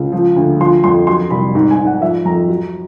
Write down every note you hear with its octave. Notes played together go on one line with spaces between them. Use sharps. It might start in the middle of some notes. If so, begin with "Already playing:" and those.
Already playing: C#2
F3
D2
F3 C6
F2 C6
F#3 C6
C2 B5
G#2
G#5
G#2
F#5
F3 E5
F2 A#5
F#3